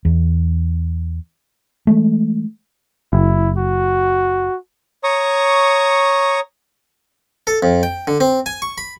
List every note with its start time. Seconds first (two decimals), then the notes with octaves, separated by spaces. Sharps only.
0.05 E2
1.87 E3 G#3 A3
3.13 F#1 E4
3.57 F#4
5.04 C#5 A#5 C#6 D#6
7.47 A4
7.63 F2
7.83 G5
8.07 D3
8.20 C4
8.46 G#5
8.62 C#6
8.78 B5